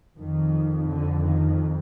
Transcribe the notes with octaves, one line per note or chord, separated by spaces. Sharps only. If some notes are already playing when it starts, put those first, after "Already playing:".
F2 D#3
D3
D#3